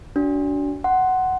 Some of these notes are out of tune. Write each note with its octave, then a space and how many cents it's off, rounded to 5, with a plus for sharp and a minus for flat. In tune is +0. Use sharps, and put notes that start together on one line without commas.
D4 -30 F#4 +25
F#5 +10 C6 +0